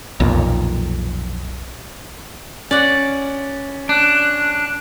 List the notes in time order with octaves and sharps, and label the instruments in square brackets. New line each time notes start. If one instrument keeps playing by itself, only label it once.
[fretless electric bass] B1 F2 A#2
[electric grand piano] C#4 [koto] D5 F#5
[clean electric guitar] D4 [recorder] F#6